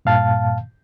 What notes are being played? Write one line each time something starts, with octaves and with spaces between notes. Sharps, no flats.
G2 A#2 F5 A5